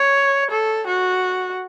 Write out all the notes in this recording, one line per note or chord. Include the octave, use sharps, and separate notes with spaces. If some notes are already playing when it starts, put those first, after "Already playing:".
Already playing: C#5
A4
F#4